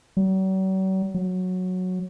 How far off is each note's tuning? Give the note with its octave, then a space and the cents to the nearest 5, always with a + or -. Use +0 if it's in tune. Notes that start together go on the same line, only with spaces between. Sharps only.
F#3 +45
F#3 -10